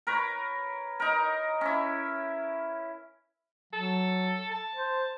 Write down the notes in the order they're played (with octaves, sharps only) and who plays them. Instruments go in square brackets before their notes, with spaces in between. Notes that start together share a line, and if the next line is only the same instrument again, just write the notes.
[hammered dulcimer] A#4 B4 C#5
D#4 A#4
C#4 E4
[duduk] F#3 [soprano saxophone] A4
[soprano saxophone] A5
[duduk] C5